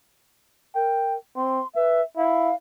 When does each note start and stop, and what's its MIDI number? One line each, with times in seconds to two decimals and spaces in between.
0.75 1.17 70
0.75 1.16 79
1.36 1.60 60
1.36 1.68 84
1.76 2.01 71
1.76 2.03 76
2.17 2.52 64
2.17 2.55 77